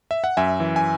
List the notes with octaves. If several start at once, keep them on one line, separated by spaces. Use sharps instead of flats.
E5
F#5
F#2 E5 G#5
E3
G#5